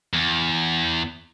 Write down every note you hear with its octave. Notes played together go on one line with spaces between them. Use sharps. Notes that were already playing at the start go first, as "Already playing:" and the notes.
E2